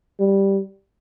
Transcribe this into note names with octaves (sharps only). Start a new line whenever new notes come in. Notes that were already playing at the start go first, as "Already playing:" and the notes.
G3